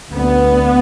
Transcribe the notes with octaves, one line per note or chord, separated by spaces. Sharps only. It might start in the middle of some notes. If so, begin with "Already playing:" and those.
D2 B3